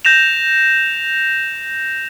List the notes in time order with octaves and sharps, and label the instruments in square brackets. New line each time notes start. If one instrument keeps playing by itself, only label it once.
[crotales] G6 A#6 E7 F7